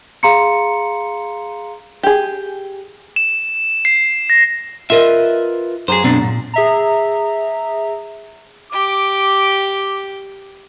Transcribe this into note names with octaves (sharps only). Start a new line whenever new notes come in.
G#4 F5 A#5 C6 C#7
G4 G#4
E7
C7
A#6
F4 A#4 B4 D#5 E5
F#2 G#4 C5 A#5
B2 C4 D4
A#2
G#4 E5 A#5
G4 D6